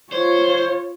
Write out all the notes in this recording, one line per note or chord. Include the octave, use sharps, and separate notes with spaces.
F4 C5 C#5